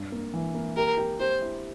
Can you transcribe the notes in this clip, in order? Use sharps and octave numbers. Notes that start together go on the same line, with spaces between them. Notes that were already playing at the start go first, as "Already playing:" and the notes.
Already playing: G2
A#3
E3
A#3
G4 A#4
G4
G4 C5
E4